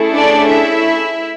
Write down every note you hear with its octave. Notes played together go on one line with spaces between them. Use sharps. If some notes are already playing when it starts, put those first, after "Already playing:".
Already playing: A3 C#4 E4 G#4
D4 D5
E4 E5